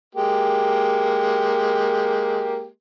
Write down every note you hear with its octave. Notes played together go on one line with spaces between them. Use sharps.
G#3 A#3 G4